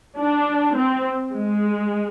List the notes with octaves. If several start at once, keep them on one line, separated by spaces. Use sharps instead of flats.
D4
C4
G#3